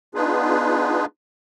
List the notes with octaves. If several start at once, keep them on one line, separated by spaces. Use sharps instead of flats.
B3 D4 D#4 F4 G#4 B4